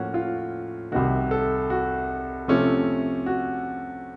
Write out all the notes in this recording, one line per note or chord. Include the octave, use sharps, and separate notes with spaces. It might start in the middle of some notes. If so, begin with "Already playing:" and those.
Already playing: A2 F3 A#3 C#4 F#4
F4
C2 C3 D#3 F#4
A4
F#4
C3 F3 A3 C#4
F#4